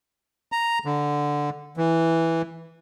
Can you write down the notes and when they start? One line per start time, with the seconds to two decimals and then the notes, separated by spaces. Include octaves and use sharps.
0.52 A#5
0.85 D3
1.77 E3